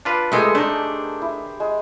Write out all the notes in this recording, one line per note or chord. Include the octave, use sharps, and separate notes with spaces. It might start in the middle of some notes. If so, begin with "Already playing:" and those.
D4 F4 B4
G#3 A3 G4 G#4 A#4
A3 D4 D#4 C5
E4
G#3